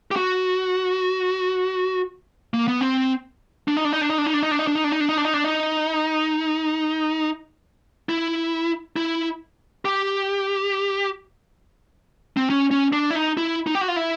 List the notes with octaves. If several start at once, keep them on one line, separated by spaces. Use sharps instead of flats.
G4
F#4
A#3
B3
C4
D4
D#4
D4
D#4
D4
D#4
D4
D#4
D4
D#4
D4
D#4
D4
D#4
D4
D#4
D4
D#4
D4
D#4
D4
D#4
E4
E4
G4
C4
C#4
C#4
D4
E4
D#4
E4
D#4
G4
F#4
F4
E4